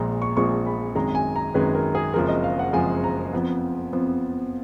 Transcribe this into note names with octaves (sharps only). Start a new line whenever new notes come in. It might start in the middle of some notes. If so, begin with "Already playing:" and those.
Already playing: A#1 A#2 F3 G#3 A#5
C#6
A#1 A#2 F3 G#3 C#6
B5
G#1 F#2 D#3 G#3 A#5
G#5
A#5
G#1 F#2 D#3 G#3 B4
A#4
G#4
F#1 F2 F3 G#3 A#4
D#5
F5
F#5
F#1 F2 F3 G#3 G#5
A#5
F2 F3 B3
F2 F3 B3